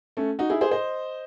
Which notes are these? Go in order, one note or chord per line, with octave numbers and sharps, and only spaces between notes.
A3 C#4
D#4 F#4
E4 G#4
G#4 C5
C5 D#5